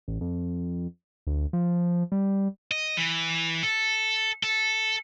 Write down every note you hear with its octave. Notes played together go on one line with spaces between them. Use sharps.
A1
F2
D2
F3
G3
D#5
E3
A4
A4